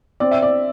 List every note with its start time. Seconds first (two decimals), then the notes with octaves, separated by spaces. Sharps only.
0.20 C4 D5
0.31 E5
0.42 D5